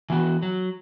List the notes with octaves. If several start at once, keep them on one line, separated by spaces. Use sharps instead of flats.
E3 B3 F#4
F#3